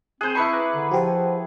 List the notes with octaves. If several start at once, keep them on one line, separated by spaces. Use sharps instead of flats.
C4 G#4 C5 F#6 G6
E4 B4 A5 B5 C#6 C#7
A#5 D6 F#6
D3
F3 F#4 G4 C5